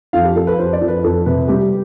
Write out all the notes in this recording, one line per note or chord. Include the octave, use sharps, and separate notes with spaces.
F2 F5
G4
F2 A4
B4
F2 C5
D5
F2
B4
F2 A4
C3 B4
G3 G4